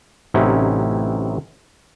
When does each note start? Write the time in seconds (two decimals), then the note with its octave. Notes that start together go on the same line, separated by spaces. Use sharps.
0.34 A1 C3 F#3 C#4 D#4 E4